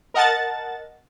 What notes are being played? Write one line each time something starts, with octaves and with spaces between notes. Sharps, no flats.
A#4 D#5 F#5 A5 A6